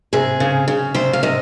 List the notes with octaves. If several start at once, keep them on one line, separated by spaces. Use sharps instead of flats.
C3 G#4
C#3
C#3
C3 C5
F5
C3 D#5